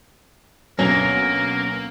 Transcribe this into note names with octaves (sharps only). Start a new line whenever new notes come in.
D2 B2 F#3 A#3 C#4 A#4